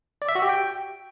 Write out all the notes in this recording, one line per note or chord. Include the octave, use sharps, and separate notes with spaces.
D5
E5
F#4
G4
G5